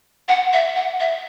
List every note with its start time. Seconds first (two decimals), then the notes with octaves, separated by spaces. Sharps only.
0.28 F#5
0.53 E5
0.76 F#5
1.00 E5